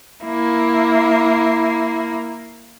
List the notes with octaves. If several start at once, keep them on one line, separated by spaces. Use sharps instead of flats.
A#3 E4